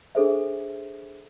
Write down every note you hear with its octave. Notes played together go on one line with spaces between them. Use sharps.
D4 G#4 A4 C5 E5